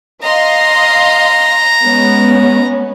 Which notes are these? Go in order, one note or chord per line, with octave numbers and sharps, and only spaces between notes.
D#5 F5 A#5 C6
G#3 B3 C#4